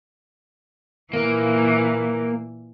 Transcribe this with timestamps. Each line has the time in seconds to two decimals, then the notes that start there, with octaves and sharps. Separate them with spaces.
1.13 A#2 E3 A#3